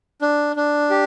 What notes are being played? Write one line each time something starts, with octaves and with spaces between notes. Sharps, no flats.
D4
D4
G4